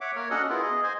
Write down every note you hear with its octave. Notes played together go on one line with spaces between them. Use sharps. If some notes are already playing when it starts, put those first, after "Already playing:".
C#5 E5 F#5 D6
A#3 A#4 C#5
C#4 D4 F#4 A4 D#5 F#5
B3 E4 F4 G#4 A#4
G#4 D#5
C5 D#5 G#5